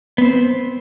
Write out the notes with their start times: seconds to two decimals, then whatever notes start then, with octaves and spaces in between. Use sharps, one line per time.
0.18 B3
0.22 C4
0.25 C5